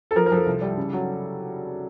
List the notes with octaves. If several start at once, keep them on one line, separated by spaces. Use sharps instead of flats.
A4
F3 A#4
A#4
F3 A4
C2
G3
C#3
F#3